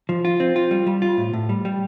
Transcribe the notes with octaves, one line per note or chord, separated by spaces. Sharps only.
F3
F4
C4
F4
G3
G3
F4
A2
A2
G3
G3